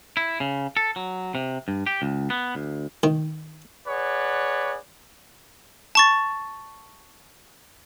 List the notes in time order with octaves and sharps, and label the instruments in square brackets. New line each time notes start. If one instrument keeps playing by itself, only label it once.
[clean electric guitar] E4
C#3
A4
F#3
C3
G2
G4
C#2
B3
D2
[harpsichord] D#3
[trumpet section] G#4 B4 C#5 D5 F#5
[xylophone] A5 C#6 A6